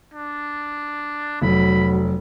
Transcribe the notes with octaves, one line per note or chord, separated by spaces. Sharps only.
D4
F1 F#3 B5